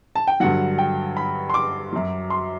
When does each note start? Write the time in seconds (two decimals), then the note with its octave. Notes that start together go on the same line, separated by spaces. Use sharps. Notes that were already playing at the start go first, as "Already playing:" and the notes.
0.15 A5
0.28 G5
0.40 G2 D3 F#3 F#5
0.78 G5
1.17 B5
1.50 C6
1.54 D6
1.93 F#2 F#3
2.30 C6